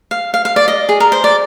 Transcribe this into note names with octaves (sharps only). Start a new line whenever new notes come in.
F5
F5
F5
D5
D#5
G#4
A#4
C5
D5